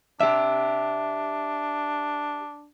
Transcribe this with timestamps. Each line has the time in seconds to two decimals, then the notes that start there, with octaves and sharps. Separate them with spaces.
0.21 D4 G4 E5